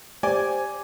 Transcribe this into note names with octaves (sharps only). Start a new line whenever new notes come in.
G4 C5 D5 G#5